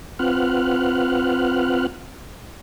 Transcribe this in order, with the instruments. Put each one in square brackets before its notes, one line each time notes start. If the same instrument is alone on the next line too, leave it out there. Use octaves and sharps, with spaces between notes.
[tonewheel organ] C4 F4 B4 F#5 F6 F#6